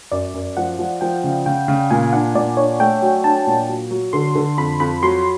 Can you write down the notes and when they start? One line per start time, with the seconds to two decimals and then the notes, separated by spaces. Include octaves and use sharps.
0.12 F#2 D5
0.34 F#2
0.57 F3 F#5
0.79 F3
1.01 F3 G5
1.24 C#3
1.46 C#3 G5
1.68 C#3
1.90 A#2 G#5
2.13 D4 F#5
2.35 A#2 D5
2.57 D4 C#5
2.80 A3 G5
3.02 F#3
3.24 D4 A5
3.47 A#2
3.69 F#3
3.91 F#3
4.13 D3 C6
4.35 D3
4.58 F2 B5
4.80 F2 B5
5.03 F#3 C6